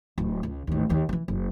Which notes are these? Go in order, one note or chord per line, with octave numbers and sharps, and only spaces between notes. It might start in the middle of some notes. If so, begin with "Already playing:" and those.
D1
C#2
A1 D#2
D#2 D#3
E3 F3
F#1